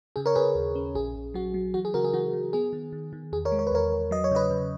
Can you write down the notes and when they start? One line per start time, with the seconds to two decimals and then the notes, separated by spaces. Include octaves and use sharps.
0.16 C#3 G#4
0.26 A#4 C#5
0.35 C#3 G#4 B4
0.55 D#2
0.75 C#4
0.95 A#1 G#4
1.16 A#1
1.34 F#3 F#4
1.54 F#3
1.74 E3 F#4
1.85 G#4
1.94 C#3 F#4 A#4
2.04 G#4
2.13 E3 F#4
2.33 E3
2.53 B3 G#4
2.73 D#3
2.93 D#3
3.13 D#3
3.32 E2 G#4
3.45 A#4 C#5
3.52 G#3
3.59 C#5
3.67 B4
3.72 E2 A#4 C#5
3.92 E2
4.11 F#3 D#5
4.24 C#5
4.31 C#3 B4 D#5
4.51 C#3